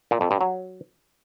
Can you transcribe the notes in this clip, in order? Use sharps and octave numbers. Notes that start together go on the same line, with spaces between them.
A#2
F2
G2
F#3